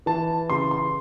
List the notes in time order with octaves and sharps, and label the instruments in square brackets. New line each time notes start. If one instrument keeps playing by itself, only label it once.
[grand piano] E3 A5
C#3 C6
C6